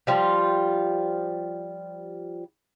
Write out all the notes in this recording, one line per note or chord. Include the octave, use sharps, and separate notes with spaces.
F3 G3 F4